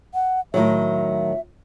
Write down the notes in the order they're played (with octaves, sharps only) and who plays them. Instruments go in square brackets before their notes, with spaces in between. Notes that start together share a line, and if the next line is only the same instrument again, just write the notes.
[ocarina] F#5
[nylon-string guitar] A2 D#3 F#3 [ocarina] E5